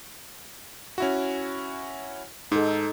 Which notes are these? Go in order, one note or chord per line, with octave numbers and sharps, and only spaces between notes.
C#4 E4 F#4
G#2 D#4 A4